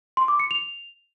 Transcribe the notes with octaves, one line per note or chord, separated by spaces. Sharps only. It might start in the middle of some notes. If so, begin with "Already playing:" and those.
C6
D6
C#7
F7